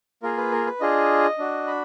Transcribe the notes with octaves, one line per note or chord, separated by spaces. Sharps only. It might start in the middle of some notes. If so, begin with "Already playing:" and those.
A#3 F4 G#4 A#4
B4
A#4
B4
D4 F4 G#4 D#5
D4 F#4
B5